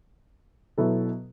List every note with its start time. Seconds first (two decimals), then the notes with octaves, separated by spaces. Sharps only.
0.78 B2 F#3 B3 E4 A4